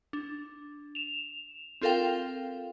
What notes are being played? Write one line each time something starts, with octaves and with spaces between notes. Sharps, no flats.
D4
E7 F7
C4 F4 A4 A#4 F5 G5